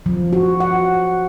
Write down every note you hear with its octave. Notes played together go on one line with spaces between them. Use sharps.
F3
F#4
F#5